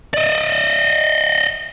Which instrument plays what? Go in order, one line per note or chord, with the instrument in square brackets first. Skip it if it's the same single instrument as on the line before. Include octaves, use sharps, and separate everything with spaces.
[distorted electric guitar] D5 D#5